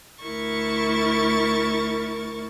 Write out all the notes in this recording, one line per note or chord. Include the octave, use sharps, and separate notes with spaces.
D2 E4 A#4 C#6 A6